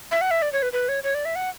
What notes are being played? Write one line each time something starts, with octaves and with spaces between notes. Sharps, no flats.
E5
F#5
E5
D5
C#5
B4
B4
C#5
C#5
D5
E5
F#5